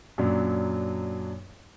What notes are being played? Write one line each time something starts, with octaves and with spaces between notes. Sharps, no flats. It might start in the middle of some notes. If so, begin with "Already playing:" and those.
F#2 A#2 F#3 D4